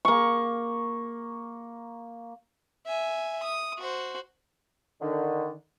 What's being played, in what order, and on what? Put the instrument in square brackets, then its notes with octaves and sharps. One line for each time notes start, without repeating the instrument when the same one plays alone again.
[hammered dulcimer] A#3 C#6
[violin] E5 G#5
D#6
F#4 C5
[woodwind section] D3 D#3